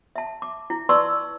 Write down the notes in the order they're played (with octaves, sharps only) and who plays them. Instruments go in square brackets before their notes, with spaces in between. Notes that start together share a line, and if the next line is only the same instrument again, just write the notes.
[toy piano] E5 A5
D6
E4
B4 D5 A5 C6 C#6 E6